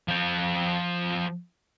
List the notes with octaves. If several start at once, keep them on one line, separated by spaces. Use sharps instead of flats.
F3 G5